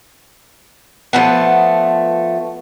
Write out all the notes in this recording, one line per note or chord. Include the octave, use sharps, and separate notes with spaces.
F3 A3 B3